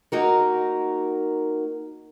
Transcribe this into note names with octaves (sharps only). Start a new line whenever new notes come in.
A#3 D#4 F#4 A#4